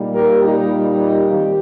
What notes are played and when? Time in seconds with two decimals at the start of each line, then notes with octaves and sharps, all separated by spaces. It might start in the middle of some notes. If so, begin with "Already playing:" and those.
Already playing: A#2 G3 A#3 D#4
0.14 G4 A#4
0.43 D#4 G4
1.30 D#3 G3 C4 D#4